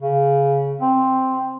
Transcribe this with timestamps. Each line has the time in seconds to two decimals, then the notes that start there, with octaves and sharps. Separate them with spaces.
0.03 C#3
0.81 C4